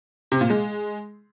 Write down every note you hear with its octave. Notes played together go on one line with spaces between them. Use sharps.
C3
A#2
G#3